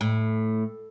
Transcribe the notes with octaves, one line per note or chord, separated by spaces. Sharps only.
A2